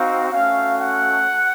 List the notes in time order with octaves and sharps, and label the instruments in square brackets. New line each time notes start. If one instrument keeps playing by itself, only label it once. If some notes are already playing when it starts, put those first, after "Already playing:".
Already playing: [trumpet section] C4 D#4 F#4 F5
A3 C#4 F#4 F5
F#5